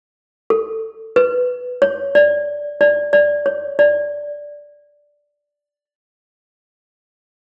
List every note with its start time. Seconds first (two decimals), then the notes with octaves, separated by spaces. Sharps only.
0.50 A4
1.16 B4
1.82 C#5
2.15 D5
2.81 D5
3.13 D5
3.46 C#5
3.79 D5